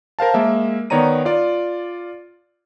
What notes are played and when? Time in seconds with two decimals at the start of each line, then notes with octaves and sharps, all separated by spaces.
0.19 A#4 C5 F5 A5
0.34 G#3 A#3 E5
0.90 D#3 B3 C#5 D5 A#5 D#7
1.25 F4 D5